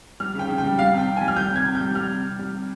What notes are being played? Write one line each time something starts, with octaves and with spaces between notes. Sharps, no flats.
G3 F6
C#3
G5
C#3
G5
G3
G3 F5
C3 G5
C3
G#5
G3
F6
G3 G6
C3
G#6
C3
G6
G3
G3 F6
C3
C3
G3
C3